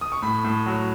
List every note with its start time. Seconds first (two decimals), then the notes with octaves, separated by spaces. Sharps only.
0.01 D#6
0.12 C#6
0.22 A2 B5
0.45 A2
0.66 F#3